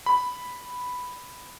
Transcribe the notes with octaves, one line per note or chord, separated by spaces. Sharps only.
B5